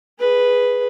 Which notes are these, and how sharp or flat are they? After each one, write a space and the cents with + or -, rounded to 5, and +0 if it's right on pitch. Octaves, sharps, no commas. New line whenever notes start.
G#4 +0 B4 +0